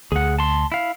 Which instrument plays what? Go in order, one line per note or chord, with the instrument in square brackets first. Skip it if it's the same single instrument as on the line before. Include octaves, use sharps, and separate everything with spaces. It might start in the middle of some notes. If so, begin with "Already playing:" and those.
[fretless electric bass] D2 [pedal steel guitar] G#4 F#5
[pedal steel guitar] A5 C6
E4 F5